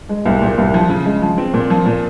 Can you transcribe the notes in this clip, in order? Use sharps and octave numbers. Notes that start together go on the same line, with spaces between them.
G#3
C2
A#2
C2
F3
C#3
G#3
F3
C4
A#2
F3
A#2